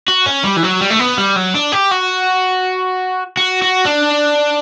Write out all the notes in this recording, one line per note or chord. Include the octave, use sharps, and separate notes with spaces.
F#4
C#4
G3
E3
F#3
G3
A3
B3
G3
F#3
D4
G4
F#4
F#4
F#4
D4